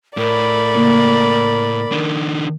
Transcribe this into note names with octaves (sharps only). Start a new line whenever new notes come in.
A2 A#4 D5 B5
C#3 A#3
D#3 D4